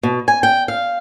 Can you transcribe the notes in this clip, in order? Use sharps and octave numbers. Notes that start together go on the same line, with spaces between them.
B2
G#5
G5
F5